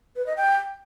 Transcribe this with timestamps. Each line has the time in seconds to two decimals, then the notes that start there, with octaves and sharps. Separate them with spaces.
0.16 B4
0.27 D#5
0.37 G5